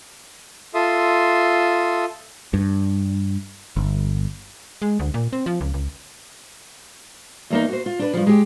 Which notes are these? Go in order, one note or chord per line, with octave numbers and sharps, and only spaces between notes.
F4 A4 E5 C6 D#6
G2
G1
G#3
D2
A#2
C4
F3
C#2
C#2
E2 A#3 D#4
F#4 C5
F4
D4 B4
G2 F3
G#3 G4